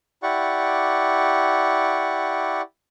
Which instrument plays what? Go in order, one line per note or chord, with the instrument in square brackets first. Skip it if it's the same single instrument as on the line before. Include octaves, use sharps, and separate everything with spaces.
[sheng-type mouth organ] E4 G4 D5 F#5 C#6